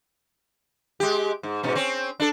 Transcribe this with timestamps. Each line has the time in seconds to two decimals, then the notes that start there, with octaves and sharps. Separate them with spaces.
1.00 G#3 G4
1.43 G#2
1.63 G#2 B2 C#4
1.75 C4 C#4
2.20 D4 A4